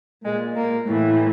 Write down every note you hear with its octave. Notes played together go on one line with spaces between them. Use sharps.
A#2 G#3
A#3
A2 E3